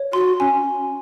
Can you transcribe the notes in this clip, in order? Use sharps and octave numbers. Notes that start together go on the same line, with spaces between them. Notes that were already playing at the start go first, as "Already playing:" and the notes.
Already playing: C#5
F#4 C6
C#4 G#5